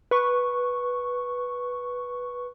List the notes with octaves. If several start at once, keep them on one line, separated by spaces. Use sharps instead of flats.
B4 C#6